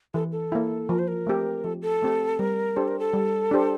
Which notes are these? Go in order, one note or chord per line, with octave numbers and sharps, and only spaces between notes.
E3 A4
A4
A#3 E4
F3 A#4
C5
A#4
A3 C4 G4
F3 A4
A4
A3 C4 G4
G3 A#4
D4 G4 A4 C5
A#4
A4
G3
D4 G4 C5